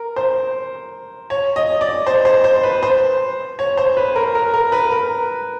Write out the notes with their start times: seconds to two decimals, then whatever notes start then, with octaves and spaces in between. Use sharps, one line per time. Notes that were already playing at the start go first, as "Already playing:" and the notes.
Already playing: A#4
0.16 C5
1.30 C#5
1.56 D#5
1.81 D5
2.07 C5
2.25 C5
2.44 C5
2.63 B4
2.83 C5
3.59 C#5
3.77 C5
3.97 B4
4.16 A#4
4.35 A#4
4.54 A#4
4.72 B4
4.91 A#4